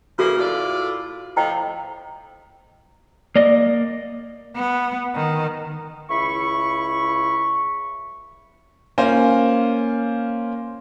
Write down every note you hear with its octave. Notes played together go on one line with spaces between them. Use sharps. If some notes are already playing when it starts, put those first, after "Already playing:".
C#3 E3 A#3 F#4 A4 F5
A2 F4 D5
A2 F3 D#5 G5 A#5
A#3 D5 D#5
B3
D#3
C#2 E4 E5 B5 C#6
A#3 C#4 F4 C5 G#5